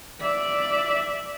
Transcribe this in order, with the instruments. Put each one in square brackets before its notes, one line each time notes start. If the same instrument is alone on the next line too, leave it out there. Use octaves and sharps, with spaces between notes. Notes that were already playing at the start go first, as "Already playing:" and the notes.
[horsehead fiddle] D5 E5